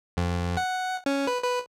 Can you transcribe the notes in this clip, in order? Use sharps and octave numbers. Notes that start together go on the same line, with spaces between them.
F2
F#5
C#4
B4
B4